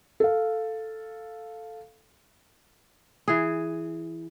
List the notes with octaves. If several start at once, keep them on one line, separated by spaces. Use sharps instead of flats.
A4 F5
E3 G#4